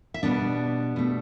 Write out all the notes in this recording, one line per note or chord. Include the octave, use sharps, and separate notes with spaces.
E5
B2 G3 B3 D4 D5
B2 A3